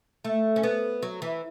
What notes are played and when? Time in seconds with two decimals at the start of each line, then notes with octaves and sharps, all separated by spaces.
0.25 A3
0.56 C#4
0.63 B3
1.03 F#3
1.22 E3